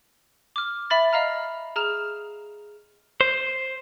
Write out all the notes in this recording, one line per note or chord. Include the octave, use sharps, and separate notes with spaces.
D6 F6
E5 B5 A6
D#5 F5 A#5 F6
G#4 A#5 F6 E7 F7
C5